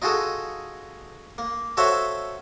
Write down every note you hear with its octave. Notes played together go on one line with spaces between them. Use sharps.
D#4 F4 F#4 G#4 A4
A#3
F#4 A4 C5 C#5 E5 F5